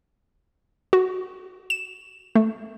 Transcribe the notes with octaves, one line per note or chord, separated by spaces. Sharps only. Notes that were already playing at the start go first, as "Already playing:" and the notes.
F#4
E7
A3